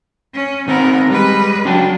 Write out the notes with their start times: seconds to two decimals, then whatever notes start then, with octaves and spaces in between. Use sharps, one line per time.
0.34 C#4
0.68 D#3 B3 C4 A#4
1.10 G3 G#3 B4
1.65 F#3 C#4 D4 F#4 G5